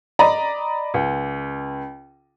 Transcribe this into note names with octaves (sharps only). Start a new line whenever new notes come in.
D5 D#5 A#5 B5
C#2